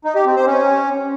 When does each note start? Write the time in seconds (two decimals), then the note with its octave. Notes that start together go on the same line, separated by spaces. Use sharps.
0.04 D#4
0.15 G4
0.26 C4
0.36 C5
0.47 C#4